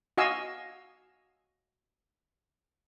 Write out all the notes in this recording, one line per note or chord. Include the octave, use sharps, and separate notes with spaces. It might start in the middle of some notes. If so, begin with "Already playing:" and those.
F#4 D#5 F5 G#5 E6